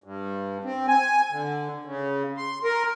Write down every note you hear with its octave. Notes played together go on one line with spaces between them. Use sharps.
G2
C4
G#5
D3
C#3
C6
A#4